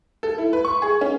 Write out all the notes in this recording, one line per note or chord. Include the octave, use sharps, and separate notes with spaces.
A4
E4
B4
C#6
G#4
C#4